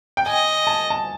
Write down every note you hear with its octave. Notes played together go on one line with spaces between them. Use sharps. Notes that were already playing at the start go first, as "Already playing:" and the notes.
G5
D#5 G#5
A5
A5